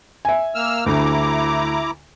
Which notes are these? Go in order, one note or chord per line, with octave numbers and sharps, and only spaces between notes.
E5 G#5
A#3 E6 F6
D2 E4 A#5 D6